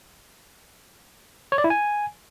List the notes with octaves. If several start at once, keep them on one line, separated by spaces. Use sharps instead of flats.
C#5
D5
E4
G#5